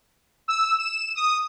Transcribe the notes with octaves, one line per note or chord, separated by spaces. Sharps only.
E6
E7
D#6